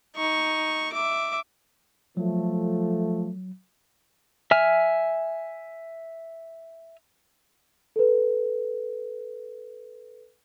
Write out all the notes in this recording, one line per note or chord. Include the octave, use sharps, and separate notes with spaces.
D#4 C#6
E5 D6
F3 F#3 A3
E5 G#5 F6
A4 B4